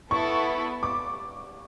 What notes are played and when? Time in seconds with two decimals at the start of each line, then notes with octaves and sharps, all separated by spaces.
0.11 B3 E4 A4 C#6
0.83 D6